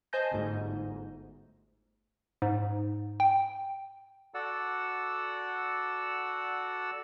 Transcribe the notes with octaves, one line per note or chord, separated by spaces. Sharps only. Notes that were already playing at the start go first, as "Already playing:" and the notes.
C5 D#5 G#5 A5 G6 A#6
G1 D2 G#2
G#2
G5
F#4 A4 D5 F#5 E6